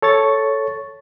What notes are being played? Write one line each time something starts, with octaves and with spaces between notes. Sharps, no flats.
A4 C#5 C#6 A6